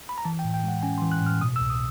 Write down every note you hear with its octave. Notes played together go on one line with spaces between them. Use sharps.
B5
A#5
E3 A5
G5
A2
G5
G#3 F#5
C#4 G#5
C6
E3
F#6
A2
F6
B2 D#6
E6
C2
D#6